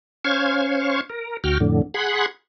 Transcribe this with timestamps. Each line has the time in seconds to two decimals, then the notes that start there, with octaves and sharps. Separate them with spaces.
0.25 C#4 C5 F5 C#6 G#6
1.10 A#4
1.44 D2 F#4 G5 F6
1.60 F2 A2 D3
1.94 G#4 F#5 B5 C6 F#6 G#6